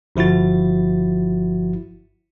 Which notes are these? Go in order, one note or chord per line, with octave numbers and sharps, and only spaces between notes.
G1 F3 E4 F#4 A6